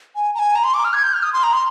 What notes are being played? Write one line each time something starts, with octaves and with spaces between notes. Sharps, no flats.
G#5
A#5
G#5
A#5
C6
D6
F6
G#6
G6
F6
D#6
C6
A#5
C6